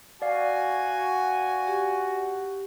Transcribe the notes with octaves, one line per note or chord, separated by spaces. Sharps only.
F#4 D5 F5 G#5
G4